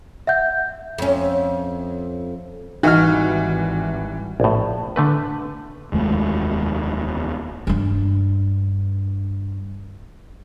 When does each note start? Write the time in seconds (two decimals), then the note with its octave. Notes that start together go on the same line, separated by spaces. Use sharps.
0.27 E5 F#5 G6
0.98 F2 C#4
2.83 G#1 E3 G3 D#4 F#4 F6
4.40 A#1 A2
4.96 D3 A3 B4
5.92 F1 D#2 G#3 A3
7.67 G2 D4